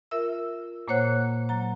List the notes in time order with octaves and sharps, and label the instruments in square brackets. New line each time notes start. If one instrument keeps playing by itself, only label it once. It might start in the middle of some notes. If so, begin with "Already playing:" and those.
[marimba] F4 A#4 E5 E6
A#2 A#3 C5 C#5 F#5 F#6
F#3 A#5